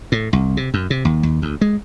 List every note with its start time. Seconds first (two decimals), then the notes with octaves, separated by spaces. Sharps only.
0.12 A2
0.33 C2
0.57 C3
0.74 F#2
0.90 C3
1.05 D#2
1.23 D#2
1.42 D2
1.61 G#3